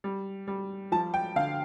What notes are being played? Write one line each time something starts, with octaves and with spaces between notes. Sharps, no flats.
G3
G3
F3 A5
G5
D3 F5